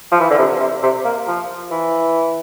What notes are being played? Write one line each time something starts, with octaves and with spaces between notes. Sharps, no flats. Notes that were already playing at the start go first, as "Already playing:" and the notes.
F3
E3
D3
C3
C3
C3
A#3
F3
E3